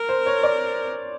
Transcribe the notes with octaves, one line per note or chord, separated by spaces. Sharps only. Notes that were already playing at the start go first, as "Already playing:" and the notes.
Already playing: A#4
C5
C#5
D5